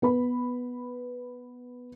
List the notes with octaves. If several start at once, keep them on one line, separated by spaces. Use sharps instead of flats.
B3 B4 B5